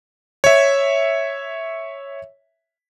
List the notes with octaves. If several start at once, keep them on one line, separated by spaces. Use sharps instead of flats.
C#5 E5